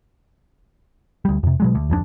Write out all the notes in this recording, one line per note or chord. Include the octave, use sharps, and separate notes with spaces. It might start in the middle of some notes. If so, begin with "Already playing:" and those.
D2 G3
F2 C3
B2 F#3 G#3
D2
D1 F2 G3 D4